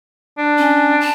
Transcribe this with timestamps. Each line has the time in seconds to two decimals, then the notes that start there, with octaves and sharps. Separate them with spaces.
0.38 D4
0.58 C#4
1.01 A5